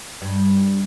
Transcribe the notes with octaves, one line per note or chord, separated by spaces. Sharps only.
G2